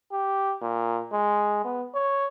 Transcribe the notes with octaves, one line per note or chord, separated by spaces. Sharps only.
G4
A#2
G#3
B3
C#5